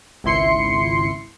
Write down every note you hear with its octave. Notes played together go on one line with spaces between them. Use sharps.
G#1 C#2 E4 C6 C7 C#7